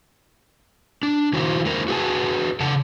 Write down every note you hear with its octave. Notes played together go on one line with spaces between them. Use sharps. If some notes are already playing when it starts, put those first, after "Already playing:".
D4
D#3 E4 F#4 A#4 C5
D3 A3 E4 A4 A#4 C5
F#4 G#4 B4 G#5 A5
C#3 A4 F#5 A5